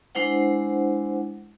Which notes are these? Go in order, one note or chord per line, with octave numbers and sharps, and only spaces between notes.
G#3 D4 E4 C5 F#5